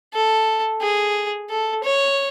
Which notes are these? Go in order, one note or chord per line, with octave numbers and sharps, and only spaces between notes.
A4
G#4
A4
C#5